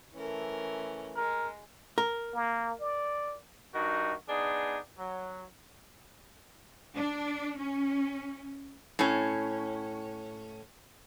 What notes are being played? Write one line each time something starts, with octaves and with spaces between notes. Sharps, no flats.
E3 A3 C#4 A#4
G#3 A#4
A#4
A#3
D5
G2 D#3 D#4 F#4
B3 D4 D#4 G#4
F#3
D4
C#4
A2 C#4